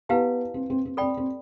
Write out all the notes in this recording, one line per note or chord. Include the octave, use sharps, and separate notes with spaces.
B3 E4 G4 B4 F5 A5
C4
C4
C4
C4 A4 D5 G5 B5
C4